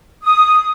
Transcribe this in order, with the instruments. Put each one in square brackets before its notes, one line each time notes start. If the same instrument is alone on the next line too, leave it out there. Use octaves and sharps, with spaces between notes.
[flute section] D#6